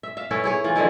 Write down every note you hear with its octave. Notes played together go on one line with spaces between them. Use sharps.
E5
E5 F5
C#4 E4 A4 B4
E4 G#4 C#5
E3 F4
D3 F3 G#3 E4